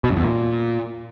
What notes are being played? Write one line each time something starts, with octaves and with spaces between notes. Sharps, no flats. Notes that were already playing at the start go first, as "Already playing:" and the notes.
B2
F#2
E2
A#2